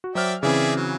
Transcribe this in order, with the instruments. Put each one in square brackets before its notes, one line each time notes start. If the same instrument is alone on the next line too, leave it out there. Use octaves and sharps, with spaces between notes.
[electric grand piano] F#4
[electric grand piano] F#3 C5 F6 [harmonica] D5 E5 G5
[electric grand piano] C#3 E3 C4 [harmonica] G#4 D5 E5
[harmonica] F#3